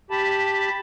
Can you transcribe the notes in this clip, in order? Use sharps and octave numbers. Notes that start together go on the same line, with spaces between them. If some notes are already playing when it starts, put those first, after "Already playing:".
G4 A5 B5